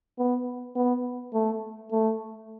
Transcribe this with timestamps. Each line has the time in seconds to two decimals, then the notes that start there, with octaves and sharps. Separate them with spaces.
0.19 B3
0.76 B3
1.34 A3
1.92 A3